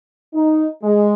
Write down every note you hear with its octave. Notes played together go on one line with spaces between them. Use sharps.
D#4
G#3